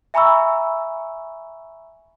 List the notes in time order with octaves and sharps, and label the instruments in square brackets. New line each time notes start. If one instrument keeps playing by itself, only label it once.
[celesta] E5 G#5 A#5 B5 C#6 E6